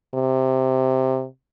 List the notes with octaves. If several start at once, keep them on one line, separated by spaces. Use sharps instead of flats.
C3